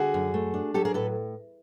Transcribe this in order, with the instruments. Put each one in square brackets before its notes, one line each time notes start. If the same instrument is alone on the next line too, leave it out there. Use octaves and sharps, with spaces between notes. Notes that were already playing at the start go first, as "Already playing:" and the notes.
Already playing: [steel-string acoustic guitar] D3 F#4 G#4
F#2
A3
D4
F#3 G4 A4
G#4 A#4
A2 A4 B4